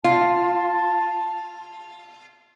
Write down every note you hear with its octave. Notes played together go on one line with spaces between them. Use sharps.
F4 A5